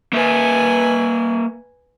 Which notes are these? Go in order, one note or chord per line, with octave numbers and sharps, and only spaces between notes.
A#3 A#4 B4 E5 G#5